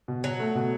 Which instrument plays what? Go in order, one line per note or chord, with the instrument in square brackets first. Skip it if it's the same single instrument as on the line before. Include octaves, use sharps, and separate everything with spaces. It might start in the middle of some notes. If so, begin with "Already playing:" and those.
[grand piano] B2
[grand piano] B2 [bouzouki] F#3
[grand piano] A3
B2